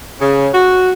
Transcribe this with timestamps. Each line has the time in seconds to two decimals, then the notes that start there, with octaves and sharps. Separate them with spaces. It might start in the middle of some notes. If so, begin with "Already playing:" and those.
0.20 C#3
0.53 F#4